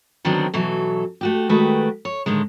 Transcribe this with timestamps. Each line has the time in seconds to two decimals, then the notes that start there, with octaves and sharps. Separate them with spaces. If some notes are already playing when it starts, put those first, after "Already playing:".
0.25 D3 D#3 F#3 B3 C4 D4
0.54 B2 E3 F#3 A4
1.21 A3 F#4 G4
1.49 D#3 G#3 A3 F#4 G4 B4
2.05 C#5
2.26 A2 D3 D#3 G#3